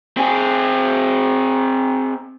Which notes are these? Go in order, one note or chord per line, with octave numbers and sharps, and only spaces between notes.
C4 G#4